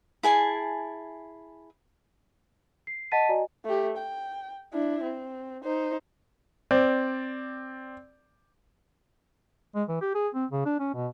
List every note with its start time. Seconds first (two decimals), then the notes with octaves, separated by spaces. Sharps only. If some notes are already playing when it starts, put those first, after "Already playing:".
0.23 E4 G#4 G#5 A5
2.87 C7
3.12 D#5 F#5 A5 A6 B6 D#7
3.29 F#4 D5 D#5 G#5 A#5
3.65 A3 G4
3.97 G5
4.73 D4 E4
5.04 C4
5.64 D#4 C5
6.71 C4 D5
9.75 G#3
9.89 E3
10.01 G4
10.15 G#4
10.34 C4
10.51 C#3
10.66 D4
10.80 C#4
10.94 B2